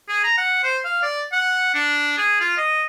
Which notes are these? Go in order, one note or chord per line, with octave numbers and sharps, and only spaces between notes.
G#4
A#5
F#5
C5
F5
D5
F#5
D4
G#4
F4
D#5